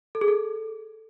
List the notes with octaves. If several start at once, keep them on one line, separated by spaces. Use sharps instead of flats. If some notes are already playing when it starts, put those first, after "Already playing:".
A4
G#4
A4